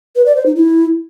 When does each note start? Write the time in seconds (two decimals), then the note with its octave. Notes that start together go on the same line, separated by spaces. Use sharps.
0.16 B4
0.26 D5
0.36 C5
0.46 D#4
0.56 E4